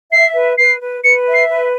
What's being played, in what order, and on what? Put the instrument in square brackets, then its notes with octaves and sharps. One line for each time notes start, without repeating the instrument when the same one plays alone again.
[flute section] E5 [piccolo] C7
[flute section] B4
[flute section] B4 [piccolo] C7
[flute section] B4
[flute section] B4 [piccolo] C#7
[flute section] E5
[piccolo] C7
[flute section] B4